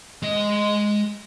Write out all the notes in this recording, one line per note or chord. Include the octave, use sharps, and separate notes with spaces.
G#3 D#5